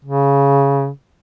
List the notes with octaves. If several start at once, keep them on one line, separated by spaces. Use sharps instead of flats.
C#3